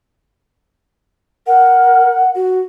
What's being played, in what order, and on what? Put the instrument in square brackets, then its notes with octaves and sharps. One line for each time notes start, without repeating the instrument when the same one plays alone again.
[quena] A#4 [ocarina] F#5
[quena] F#4